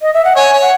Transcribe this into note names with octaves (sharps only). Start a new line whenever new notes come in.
D#5
E5
F#5
C#5 G#5
C#5
F#5